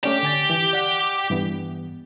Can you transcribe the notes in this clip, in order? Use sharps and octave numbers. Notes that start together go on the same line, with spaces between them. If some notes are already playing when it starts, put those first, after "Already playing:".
A3 C#4 G4 D5
D3 G#5 A6
E3
D5 F#5
G2 E3 B3